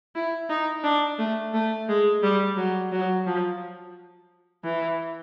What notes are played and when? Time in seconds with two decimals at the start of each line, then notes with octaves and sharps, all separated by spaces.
0.15 E4
0.49 D#4
0.84 D4
1.19 A3
1.54 A3
1.89 G#3
2.23 G3
2.57 F#3
2.92 F#3
3.26 F3
4.64 E3